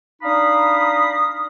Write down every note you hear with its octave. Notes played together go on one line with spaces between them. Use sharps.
D4 D#4 F5 A#5 B5 D#6